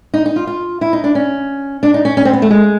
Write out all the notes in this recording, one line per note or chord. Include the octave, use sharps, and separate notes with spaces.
D#4
D#4
F4
F4
E4
D#4
D4
C#4
D4
D#4
C#4
C#4
C4
B3
A3
G#3